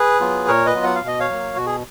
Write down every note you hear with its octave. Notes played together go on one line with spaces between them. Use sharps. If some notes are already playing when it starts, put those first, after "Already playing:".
Already playing: G#4 B4
F#3 B3 F4
A#2 A#4 C#5
B4 D#5
F#3 B3 F4
F#5
F5
B2
D#5
C#5 F5
F#3 A#3
B2 F#4
G#4